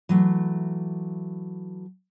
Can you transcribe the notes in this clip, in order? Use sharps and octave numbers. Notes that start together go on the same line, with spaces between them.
E3 F#3 A3